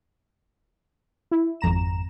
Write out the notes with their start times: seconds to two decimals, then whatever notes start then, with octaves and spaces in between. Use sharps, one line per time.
1.31 E4
1.61 G#1 F2 A#5 E7